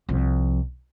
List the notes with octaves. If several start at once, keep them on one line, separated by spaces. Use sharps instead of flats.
C2 F3